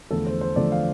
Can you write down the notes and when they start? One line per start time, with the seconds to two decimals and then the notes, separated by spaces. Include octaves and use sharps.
0.11 E2 D3 F3 A3 A4
0.26 C5
0.41 C5
0.56 E2 D3 F3 A3 D5
0.72 F5